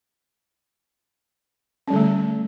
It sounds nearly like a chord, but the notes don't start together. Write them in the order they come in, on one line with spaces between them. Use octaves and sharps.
C#4 G3 D3 A3